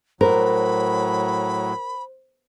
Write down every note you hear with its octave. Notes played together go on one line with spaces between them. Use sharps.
A2 F#3 A#4 C5 B5